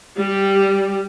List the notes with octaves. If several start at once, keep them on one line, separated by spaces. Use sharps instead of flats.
G3 G4